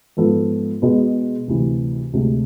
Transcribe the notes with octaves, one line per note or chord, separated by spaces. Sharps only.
G#2 F3 B3 F4 A4
B2 G#3 B3
D2 C3 E3
D2 C3 G#3